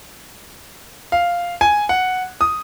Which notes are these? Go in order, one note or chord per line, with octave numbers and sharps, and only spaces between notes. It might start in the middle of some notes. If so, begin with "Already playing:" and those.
F5
G#5
F#5
D#6